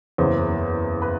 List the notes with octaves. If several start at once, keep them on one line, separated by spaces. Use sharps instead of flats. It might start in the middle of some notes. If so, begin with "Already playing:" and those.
F#1 E2 C#3 C5
B4